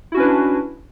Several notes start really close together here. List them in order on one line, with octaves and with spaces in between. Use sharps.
E4 F#4 C#4 B4 D4